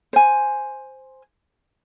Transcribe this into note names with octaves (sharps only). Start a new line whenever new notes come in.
C5 G#5